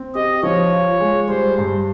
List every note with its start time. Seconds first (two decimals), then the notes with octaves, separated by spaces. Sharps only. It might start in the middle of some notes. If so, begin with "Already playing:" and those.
Already playing: C4
0.15 G4 D#5
0.43 F3 C#5
0.72 F4
1.00 G#3
1.29 G3 C5
1.58 G2